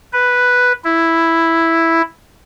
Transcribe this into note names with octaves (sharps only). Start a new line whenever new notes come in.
B4
E4